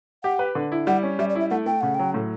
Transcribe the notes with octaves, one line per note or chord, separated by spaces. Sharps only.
G4 F#5
B4
D3
E4
G3 F#5
C#4
G3 E5
D5
E4 E5
A3 F#5
A3 G5
C#3 F#5
F#3 G5
A2